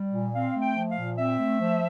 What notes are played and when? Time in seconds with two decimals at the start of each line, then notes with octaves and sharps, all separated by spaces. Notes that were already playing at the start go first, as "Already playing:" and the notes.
Already playing: G3
0.13 A#2
0.34 C4 F5
0.56 A3
0.62 G5
0.76 F3
0.91 F5
0.97 A#2
1.18 C4 E5
1.39 A3
1.60 F3